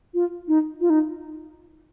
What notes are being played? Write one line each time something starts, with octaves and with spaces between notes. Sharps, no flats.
F4
D#4
F4
D#4